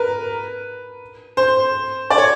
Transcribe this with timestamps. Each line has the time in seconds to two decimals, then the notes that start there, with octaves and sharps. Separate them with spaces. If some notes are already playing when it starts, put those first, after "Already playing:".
Already playing: A#4 B4
1.37 C5
2.10 D5
2.18 C#5